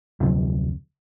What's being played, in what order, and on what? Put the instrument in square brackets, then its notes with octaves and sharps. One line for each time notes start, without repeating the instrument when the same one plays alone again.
[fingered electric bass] F1 D2 C3 F#3